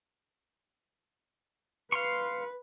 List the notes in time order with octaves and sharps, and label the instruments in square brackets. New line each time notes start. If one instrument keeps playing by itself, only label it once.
[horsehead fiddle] B4 [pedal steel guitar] F5 C6 C#6